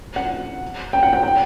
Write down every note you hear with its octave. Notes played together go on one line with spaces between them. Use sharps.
F#5
G5
F#5
G5
G5